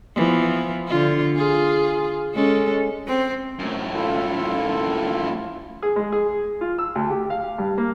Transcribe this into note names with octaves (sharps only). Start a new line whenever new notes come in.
E3 F3 B3
D3 F4
F4 G#4
G#3 C#4 A4
C4
F#2 A2
E4 F4 A4
G#4
G#3
G#4
F4
E6
D2
G4
F5
G2
A#3